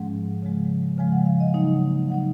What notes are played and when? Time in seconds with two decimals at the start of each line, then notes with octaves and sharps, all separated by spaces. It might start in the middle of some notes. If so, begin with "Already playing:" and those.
Already playing: G#2 F3 G#3 C#4 F#5
0.42 C#3 F3 G#3
0.98 C#3 F3 G#3 G#5
1.12 F#5
1.26 F5
1.40 D#5
1.54 C#3 F#3 A#3 D#4
2.10 C#3 F#3 A#3 D#4 F#5